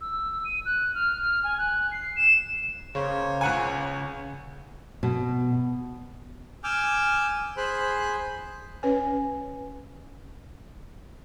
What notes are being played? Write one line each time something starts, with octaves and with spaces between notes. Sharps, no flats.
E6
D#7
F#6
F6
G#5
F#6
C7
E7
C#3 A#3 C5 C#5
C#2 F#5 G#5
B2
G#5 D6 E6 F6 G6
G#4 C5 B5 F#6
C#4 B4 C#5 G#5